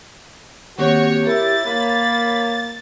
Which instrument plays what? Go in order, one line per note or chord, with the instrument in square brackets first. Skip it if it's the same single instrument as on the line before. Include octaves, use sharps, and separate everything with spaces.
[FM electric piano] D#3 A#3 C4 [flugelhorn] F#4 [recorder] G4 [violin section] C#5
[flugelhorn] E4 [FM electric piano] A#4 C#5 [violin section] A6
[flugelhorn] A#3 [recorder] B5